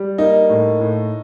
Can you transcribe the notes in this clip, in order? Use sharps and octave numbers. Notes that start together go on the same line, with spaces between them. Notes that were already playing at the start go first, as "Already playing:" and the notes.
Already playing: G3
A#3 D#4
A2
A2